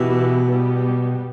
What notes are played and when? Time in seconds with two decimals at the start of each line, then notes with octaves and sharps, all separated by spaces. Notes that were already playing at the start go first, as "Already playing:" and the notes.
Already playing: B2 E3 B3 E4 G4 B4
0.48 G3 B3 G4